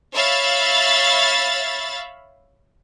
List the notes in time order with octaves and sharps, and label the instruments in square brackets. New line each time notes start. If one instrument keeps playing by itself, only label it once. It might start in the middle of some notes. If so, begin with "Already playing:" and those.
[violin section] C#5 E5 F5 B5 A6